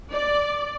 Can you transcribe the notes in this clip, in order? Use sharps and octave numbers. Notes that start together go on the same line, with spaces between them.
D5